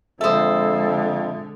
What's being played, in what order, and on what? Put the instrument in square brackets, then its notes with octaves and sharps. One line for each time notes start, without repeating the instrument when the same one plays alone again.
[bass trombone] F2 [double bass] D3 G#3 [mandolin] A4 C5 [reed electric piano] E5 D#6